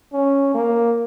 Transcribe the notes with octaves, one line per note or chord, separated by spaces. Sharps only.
C#4
A#3